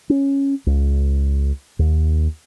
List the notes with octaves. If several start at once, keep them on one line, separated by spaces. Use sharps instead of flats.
C#4
C#2
D#2